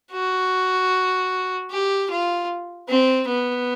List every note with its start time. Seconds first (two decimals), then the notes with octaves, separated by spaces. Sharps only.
0.12 F#4
1.71 G4
2.10 F4
2.88 C4
3.28 B3